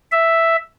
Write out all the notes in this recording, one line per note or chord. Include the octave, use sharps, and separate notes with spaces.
E5